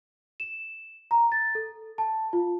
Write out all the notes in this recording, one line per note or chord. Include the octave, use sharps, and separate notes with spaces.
E7
A#5
A6
A4
A5
F4